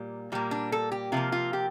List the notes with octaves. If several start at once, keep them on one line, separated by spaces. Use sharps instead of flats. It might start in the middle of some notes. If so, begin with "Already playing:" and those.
Already playing: A#2 G3 A#3
A#2 G3 A#3
D4
A4
G4
C3 F3 A#3 F4
F4
G4